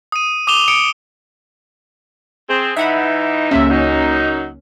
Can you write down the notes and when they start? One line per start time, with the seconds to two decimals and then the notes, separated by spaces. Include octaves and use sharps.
0.12 D#6 D#7
0.47 D6 D#6 E7 F7 G7
0.68 D#6 C#7 D7
2.49 C4 G#4
2.77 E3 D#4 E5 F#5 B5
3.51 C#2 C3 A#3 C#4 E5
3.70 F#2 F#3 D#4